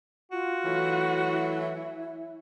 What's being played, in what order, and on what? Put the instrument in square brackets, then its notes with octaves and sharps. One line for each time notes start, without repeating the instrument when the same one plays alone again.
[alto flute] F4 [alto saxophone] F#4
[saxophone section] E3 F#3 A3
[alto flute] E4